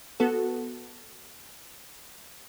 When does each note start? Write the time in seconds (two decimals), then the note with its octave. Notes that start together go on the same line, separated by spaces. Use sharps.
0.20 B3 F#4 A4